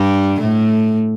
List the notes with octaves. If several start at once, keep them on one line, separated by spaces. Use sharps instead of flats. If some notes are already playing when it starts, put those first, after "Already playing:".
Already playing: G2 G3
A2 A3